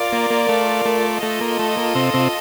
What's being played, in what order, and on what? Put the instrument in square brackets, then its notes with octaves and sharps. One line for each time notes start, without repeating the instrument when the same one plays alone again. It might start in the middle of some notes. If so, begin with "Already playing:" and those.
Already playing: [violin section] F4 A#4 D5 F5
[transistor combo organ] A#3
A#3
A3
A3
[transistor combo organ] A3 [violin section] F4 A4 D#5
[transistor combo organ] A#3
A3
A#3
C3 C4
C3 C4